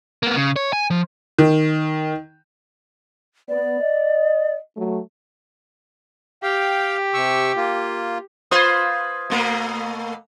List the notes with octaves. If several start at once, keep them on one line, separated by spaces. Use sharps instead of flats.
A#3 B3
C#3
C#5
G#5
F3
D#3
B3 D5
D#5
F#3 A3
G4 F5 G5
C3 C#6 E6
A#3 F4
F4 B4 C5 D#6 G#6
B2 A3 A#3